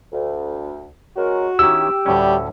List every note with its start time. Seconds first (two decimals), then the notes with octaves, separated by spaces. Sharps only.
0.12 D2
1.17 G#3 C#4 F#4 A#4
1.59 D#3 C#4 E4 G4 E6
2.06 D2 A2 G3 C#4